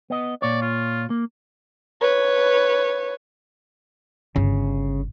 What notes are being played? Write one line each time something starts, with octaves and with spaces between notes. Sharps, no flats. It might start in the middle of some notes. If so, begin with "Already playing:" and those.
B3 D#5
A#2 C#5 D5
F4
A#3
B4 C#5
G1 C#3